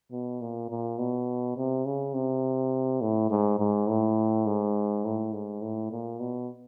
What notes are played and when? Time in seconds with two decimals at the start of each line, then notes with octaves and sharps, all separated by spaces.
0.12 B2
0.41 A#2
0.70 A#2
0.99 B2
1.57 C3
1.86 C#3
2.14 C3
3.01 A2
3.30 G#2
3.60 G#2
3.89 A2
4.47 G#2
5.05 A2
5.33 G#2
5.62 A2
5.91 A#2
6.20 B2